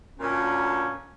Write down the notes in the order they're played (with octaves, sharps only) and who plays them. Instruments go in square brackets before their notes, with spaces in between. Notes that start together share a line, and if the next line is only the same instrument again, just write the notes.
[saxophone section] D2 A#2 [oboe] C#4